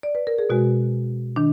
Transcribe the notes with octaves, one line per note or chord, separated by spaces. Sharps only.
D5
B4
A#4
G#4
B2 G#3 F#4
D#3 D4